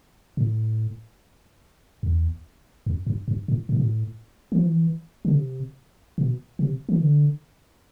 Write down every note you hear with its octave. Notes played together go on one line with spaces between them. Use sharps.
A2
E2
F2
G2
G2
A2
A2
B2
A2
E3
F3
E3
D3
C3
B2
C3
E3
D3